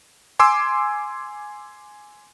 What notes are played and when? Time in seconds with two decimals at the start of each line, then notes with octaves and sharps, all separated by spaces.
0.39 G#5 C6 D6 E6